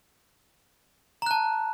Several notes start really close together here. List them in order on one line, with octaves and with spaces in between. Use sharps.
A#5 F#6 A5